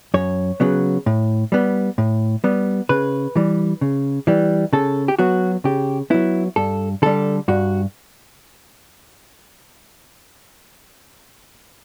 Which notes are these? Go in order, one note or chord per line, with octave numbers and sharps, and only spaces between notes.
F#2 C#5
C#3 F#3 B3
A2
G3 B3
A2
G3 B3
C#3 B4
E3 G3
C#3
E3 G3
C#3 A4
G4
F#3 B3 F#4
C#3 G4
F#3 B3 E4
G2 A4
D3 G3 A4
G2 F#4